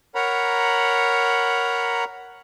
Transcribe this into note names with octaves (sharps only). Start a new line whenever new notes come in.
A#4 C#5 F#5 A#5 B5